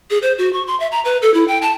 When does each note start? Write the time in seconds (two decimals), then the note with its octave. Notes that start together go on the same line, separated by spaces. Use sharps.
0.10 G#4
0.22 C5
0.38 F#4
0.53 C#6
0.67 C6
0.80 E5
0.92 A#5
1.05 B4
1.22 A4
1.34 E4
1.48 G5
1.62 A5